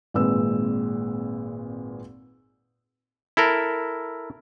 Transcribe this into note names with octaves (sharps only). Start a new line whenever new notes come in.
G#1 A#2 G#3 C4 B4 E6
E4 A4 A#4